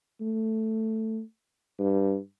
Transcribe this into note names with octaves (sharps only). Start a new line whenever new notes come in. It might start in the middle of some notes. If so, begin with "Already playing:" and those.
A3
G2